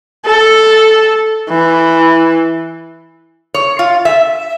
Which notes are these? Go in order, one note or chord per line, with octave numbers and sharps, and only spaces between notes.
A4
E3
C#5
F4
E5